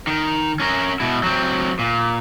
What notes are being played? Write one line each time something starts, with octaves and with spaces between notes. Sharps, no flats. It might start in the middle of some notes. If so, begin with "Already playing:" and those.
D#3
C#4 A#4
B2 E4
F#3 C4
A#2